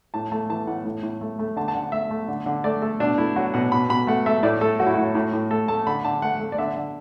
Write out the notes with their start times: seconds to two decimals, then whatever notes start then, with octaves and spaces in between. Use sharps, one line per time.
0.14 A2 A5
0.32 A3 A5
0.49 E3 A5
0.67 A2 F#5
0.85 A2
1.03 A2
1.21 A3
1.39 A3
1.56 D3 A5
1.68 A5
1.75 D3 F#5
1.92 A3 E5
2.10 A3
2.28 D3
2.46 D3
2.64 A3 D5
2.82 A3 A4
3.00 B2 D4
3.18 A3 E4
3.36 F#3 F#4
3.54 B2 F#5
3.72 B2 B5
3.90 B2 B5
4.07 A3 F#5
4.26 A3 E5
4.43 A2 D5
4.61 A3 A4
4.80 F#3 F#4
4.86 E4
4.94 A2 F#4
5.15 A2
5.33 A2
5.51 A3 A4
5.68 A3 A5
5.87 D3 B5
6.04 D3 A5
6.22 A3 F#5
6.40 A3
6.52 D5
6.58 D3 E5
6.77 D3